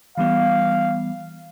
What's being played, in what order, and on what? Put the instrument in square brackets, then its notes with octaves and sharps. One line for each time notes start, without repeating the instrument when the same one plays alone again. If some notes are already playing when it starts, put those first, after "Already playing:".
[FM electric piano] E3 G3 B3 [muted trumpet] F5